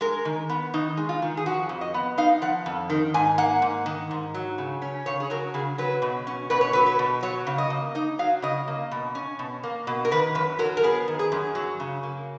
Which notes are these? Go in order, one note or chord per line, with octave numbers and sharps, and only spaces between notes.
G#3 A#4
D#3
B3
D#3 D#4
G#3
F4
D#3
G#4
F3 F#4
F2
D#5
B3
D#4 F5
F3 F#5
F2
D#3
G#2 G#5
A#3 F#5
G#2
D#3
G#2
F#3
C#3
C#4
C#3 C#5
G#4
F#3 A#4
C#3 G#4
F#3 B4
B2
C#4
B2 B4
C#5
F#3 B4
B4
B2
F#3 C#5
C#3
D#5
A#3
D#4 D#5
F#3 F5
C#3 D#5
A#3
B2
C#4
B2
A#3
B2
A#4
D#3 B4
F#2 B4
F#3 A#4
A#4
B3 G#4
D#3
G#4
F#2
F#3
C#3
A#3